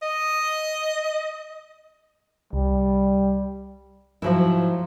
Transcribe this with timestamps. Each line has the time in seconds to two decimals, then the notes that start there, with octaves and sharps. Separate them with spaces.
0.02 D#5
2.53 C2 G3
4.22 G#2 F3 F#3 E4